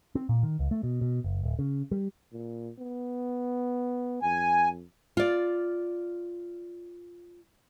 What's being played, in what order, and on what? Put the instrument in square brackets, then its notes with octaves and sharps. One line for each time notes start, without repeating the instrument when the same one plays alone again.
[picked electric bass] C4
A#2
D#3
C#2
A3
B2
B2
F#1
D1
C#3
G3
[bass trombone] A#2
B3
[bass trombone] F2 [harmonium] G#5
[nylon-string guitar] F4 D5